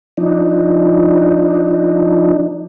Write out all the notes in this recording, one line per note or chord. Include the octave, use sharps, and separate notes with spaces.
F3 D4 D#4